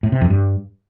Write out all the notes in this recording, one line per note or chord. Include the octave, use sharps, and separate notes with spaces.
A2
C3
F2
G2